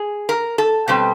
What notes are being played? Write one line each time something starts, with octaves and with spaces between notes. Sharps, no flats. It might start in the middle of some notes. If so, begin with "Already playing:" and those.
Already playing: G#4
A#4
A4
B2 G3 C4